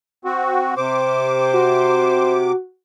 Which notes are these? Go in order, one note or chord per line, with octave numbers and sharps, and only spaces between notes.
C4 F#4
C3 C5 D6
F#4